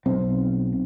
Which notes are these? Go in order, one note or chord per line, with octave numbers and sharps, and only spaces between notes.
B1 C4